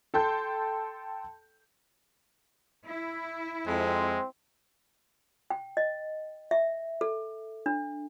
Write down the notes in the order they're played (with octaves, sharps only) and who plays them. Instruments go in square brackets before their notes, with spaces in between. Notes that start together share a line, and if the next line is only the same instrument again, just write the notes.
[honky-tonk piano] A4 G5 A5 C6 G6
[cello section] E4
[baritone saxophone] F2 [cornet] G#3 [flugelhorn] C4
[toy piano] G5
D#5
E5
A4
D4